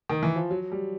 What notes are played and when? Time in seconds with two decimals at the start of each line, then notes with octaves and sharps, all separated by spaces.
0.09 D#3
0.23 E3
0.36 F3
0.51 F#3
0.72 G3